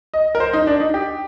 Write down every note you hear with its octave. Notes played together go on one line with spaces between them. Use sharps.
D#5
A#4
C5
D#4
D4
D#4
G4